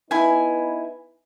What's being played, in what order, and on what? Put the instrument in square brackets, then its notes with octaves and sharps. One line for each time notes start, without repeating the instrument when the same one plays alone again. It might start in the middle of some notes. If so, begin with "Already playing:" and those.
[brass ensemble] B3 D#4 B4 [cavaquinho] E4 G#5